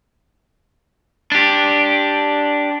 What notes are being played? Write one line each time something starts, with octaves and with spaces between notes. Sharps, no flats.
D4 G4